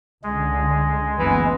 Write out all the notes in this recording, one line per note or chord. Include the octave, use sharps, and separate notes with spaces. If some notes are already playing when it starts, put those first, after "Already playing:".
C#2 D3 G#3
F#1 E3 B3